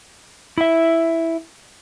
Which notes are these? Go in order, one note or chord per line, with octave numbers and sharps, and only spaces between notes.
E4 E5